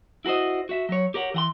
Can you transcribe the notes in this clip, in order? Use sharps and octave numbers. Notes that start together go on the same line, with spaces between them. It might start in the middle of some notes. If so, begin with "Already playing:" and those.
E4 F#4 A#4 C5 D#5
F#4 E5
F#3 C#5
G4 A#4 C#5 F#5
E3 F#5 C6